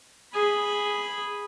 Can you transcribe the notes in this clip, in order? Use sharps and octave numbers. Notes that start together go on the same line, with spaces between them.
G#4 B5